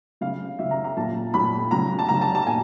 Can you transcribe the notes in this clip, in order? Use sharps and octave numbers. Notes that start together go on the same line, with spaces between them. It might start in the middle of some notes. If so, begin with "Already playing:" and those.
C#3 F#3 F5
C#3 F#3 E5
A#5
A#5
A#2 F#3 A5
A#2 F#3 B5
C#3 F#3 A#5
A5
C#3 F#3 A#5
A5
A5
A#2 G#5